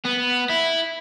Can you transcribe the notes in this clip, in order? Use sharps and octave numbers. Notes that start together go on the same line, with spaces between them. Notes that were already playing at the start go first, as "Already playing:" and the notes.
B3
E4